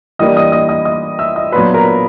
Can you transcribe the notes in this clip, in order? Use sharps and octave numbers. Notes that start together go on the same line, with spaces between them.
E3 G3 A#3 D4 D#5 D#6
D#5 D#6
D#5 D#6
D#5 D#6
D#5 D#6
E5 E6
D#5 D#6
A#2 F#3 B3 D4 F4 B4 B5
A#4 A#5